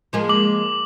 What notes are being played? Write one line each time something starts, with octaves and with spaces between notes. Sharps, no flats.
F3 G#3 A#3
D6 F#7